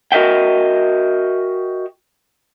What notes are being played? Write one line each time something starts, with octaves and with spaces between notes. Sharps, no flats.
F#4 A#4 D#5 E5 G5